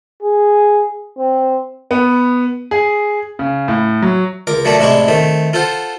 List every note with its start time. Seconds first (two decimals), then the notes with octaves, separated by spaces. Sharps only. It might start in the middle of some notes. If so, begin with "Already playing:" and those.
0.22 G#4
1.18 C4
1.91 B3
2.71 G#4
3.39 C#3
3.68 A2
4.02 F#3
4.47 C#2 A#4 D6
4.65 F#3 A3 A#3 D4 A#5
4.79 A1 C3 G#3 D4 E4 C#6
5.08 D#3 A3 C4
5.53 F4 A4 C5 F5 F#5